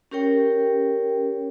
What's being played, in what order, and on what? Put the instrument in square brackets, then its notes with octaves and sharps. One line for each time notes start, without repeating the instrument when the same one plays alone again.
[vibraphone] C#4 G4 A#4 C#5 G5